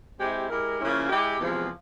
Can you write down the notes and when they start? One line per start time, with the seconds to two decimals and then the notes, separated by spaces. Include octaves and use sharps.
0.20 G#3 C4 E4 G4
0.50 G#3 E4 G4 A#4
0.80 C#3 F3 A#3 C#4 E4
1.09 G#3 E4 G4
1.39 E2 C3 F3 G#3